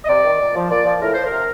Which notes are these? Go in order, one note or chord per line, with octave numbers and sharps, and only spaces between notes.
D#5
C3 D5
D#3
A#2
F3
A#2 D5
F3
A2 A#4
F3 C5
A#4
C3